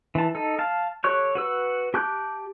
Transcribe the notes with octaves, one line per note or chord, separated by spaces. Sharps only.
E3 A5
D#4 A4
F5 A5
G4 A4 C#5 C#6 F#6
F#4 B4 E6
G4 A5 D6 F#6 G6